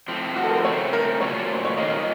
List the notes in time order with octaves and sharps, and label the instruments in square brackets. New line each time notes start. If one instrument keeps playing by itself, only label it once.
[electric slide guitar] A2 F3 C4
[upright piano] F#4
A4
A#4
C5
[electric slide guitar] C#3 A3 C4 [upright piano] C#5
[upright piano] A#4
[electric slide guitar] A#2 F#3 A3 C#4 F4 [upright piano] C#5
[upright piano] C5
C#5
[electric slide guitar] D#3 A#3 F4 [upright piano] D#5
[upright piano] D#5